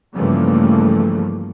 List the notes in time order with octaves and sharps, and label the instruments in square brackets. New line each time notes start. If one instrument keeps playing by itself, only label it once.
[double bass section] G2 C#3 E3 F3 A3 A#3